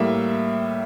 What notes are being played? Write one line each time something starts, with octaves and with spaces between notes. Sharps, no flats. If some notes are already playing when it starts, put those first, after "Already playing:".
Already playing: A2 G3 A#3 E5